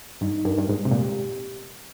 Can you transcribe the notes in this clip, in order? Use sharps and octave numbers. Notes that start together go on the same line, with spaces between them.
G2 D#4
G2 A#4
G2
G#2 G#3
C3
A#2 G4